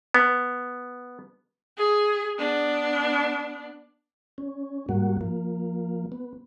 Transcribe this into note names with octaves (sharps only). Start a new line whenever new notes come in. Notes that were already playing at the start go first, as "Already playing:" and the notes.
B3
G#4
B3 D4
C#4
G#2 G3 A#3 F#4
F3 A#3
B3